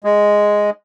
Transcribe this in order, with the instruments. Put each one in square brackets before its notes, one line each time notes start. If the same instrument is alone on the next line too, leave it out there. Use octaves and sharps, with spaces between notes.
[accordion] G#3